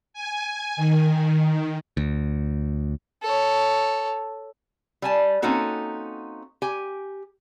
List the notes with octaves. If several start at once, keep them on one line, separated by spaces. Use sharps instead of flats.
G#5
D#3
D2
A4 C#5
G3 G#5 A5
A#3 C4 C#4 D#4 F#4 A4
G4 G#5